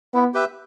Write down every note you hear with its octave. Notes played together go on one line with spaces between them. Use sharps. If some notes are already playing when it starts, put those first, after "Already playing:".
B3 E4
G4 B4 E5